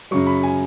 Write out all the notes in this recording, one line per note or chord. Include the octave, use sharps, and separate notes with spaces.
F#2 C#3 F#3 C#6
B5
G#5